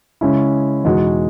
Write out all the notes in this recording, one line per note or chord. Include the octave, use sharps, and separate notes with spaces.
C#3 G#3 C#4 E4
E2 B2 G#3 D#4 F#4